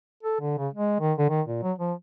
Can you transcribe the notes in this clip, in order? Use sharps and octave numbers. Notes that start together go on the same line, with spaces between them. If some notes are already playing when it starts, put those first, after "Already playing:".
A4
D3
C#3
G#3
D#3
D3
D#3
A#2
F#3
F3